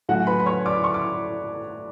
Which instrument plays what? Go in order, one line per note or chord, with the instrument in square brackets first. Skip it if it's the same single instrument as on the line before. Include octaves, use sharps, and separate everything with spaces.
[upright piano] A2 F#3 C#4 F#4 F#5
B4 B5
B5
C#5 C#6
D5 D6
C#6
D6